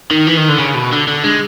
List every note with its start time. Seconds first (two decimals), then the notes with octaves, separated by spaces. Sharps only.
0.11 D#3
0.27 E3
0.37 D#3
0.49 D3
0.59 C#3
0.75 B2
0.92 D3
1.08 D3
1.24 G#3